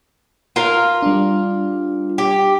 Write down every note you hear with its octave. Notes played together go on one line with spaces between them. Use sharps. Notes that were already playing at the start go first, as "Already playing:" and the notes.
F4 A#4 F5
G3 D4
G4